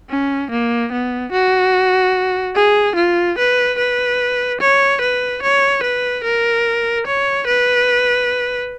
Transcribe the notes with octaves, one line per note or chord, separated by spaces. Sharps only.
C#4
A#3
B3
F#4
G#4
F4
B4
B4
C#5
B4
C#5
B4
A#4
C#5
B4